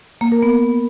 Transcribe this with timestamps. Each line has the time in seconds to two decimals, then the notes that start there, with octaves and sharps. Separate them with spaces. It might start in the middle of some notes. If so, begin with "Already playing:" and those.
0.21 A#3
0.32 A#4
0.43 B3